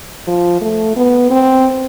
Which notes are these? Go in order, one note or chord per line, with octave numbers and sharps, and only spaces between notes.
F3
A3
B3
C4